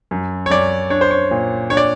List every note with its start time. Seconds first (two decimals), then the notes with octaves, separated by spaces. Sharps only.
0.11 F#2
0.46 C#5
0.50 F#2 D5
0.90 D4 C#5
1.01 C5
1.11 C#5
1.31 A#2
1.70 D4 C#5
1.77 D5